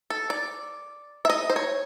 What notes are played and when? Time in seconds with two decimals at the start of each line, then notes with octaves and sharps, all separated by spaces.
0.10 A4
0.30 D5
1.25 E5
1.30 D#5
1.50 C5
1.56 C#5